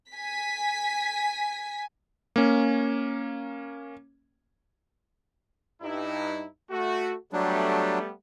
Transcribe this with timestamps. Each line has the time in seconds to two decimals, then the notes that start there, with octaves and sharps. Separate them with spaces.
0.13 G#5 B6
2.36 A#3 C#4
5.82 G2 D#4 E4
6.71 A3 F#4
7.33 F#3 G3 A3 B3 D4